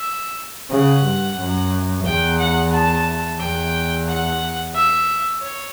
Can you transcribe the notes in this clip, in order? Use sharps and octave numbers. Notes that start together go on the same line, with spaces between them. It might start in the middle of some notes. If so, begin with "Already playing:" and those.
Already playing: E5
C#3 F#5
G2
F#2
E2 G5
F#5
A5
E2 G5
F#5
E5
C#5